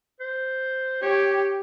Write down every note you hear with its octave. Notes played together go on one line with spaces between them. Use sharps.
C5
G4 C#5